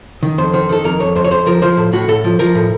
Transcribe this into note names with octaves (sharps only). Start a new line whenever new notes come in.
D#3
F2 C5
D#3 C5
D#3 A4
F2 A#4
F2 C#5
F2 C5
C#5
F2 C5
F3 A#4
F3 C5
A2
A2 F#4
A2 A4
F3
F3 A#4
A2